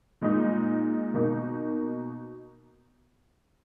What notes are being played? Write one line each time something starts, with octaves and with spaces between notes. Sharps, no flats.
A#2 G#3 D#4
B2 A#3 D#4